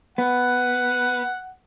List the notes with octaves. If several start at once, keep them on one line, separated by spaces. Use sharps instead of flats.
B3 F#5